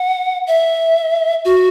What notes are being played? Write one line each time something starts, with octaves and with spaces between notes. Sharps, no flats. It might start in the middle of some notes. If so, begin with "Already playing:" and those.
Already playing: F#5
E5
F#4